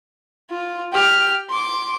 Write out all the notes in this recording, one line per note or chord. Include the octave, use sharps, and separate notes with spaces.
F4
G4 F6
C6 D6